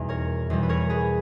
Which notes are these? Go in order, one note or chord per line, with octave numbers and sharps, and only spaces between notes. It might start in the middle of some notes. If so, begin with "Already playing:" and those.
Already playing: E2 B2 G3 D#4
A#4 C#5
E2 B2 G3
B4
A#4 C#5
G#4 B4